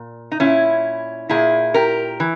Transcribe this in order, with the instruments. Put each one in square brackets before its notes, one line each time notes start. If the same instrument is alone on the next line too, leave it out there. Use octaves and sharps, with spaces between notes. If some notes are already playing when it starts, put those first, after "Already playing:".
Already playing: [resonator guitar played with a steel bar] A#2
D#4
A#2 C#4 E4
A#2 E4 G#4
G4 A#4
E3